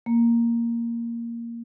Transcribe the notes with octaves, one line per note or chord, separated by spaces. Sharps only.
A#3